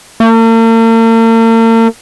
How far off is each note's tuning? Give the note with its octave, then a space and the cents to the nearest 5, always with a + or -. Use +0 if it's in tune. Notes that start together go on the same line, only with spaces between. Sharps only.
A#3 -45